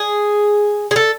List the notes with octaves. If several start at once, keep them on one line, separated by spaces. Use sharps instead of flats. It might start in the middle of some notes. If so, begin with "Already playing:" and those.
Already playing: G#4
G#4
A4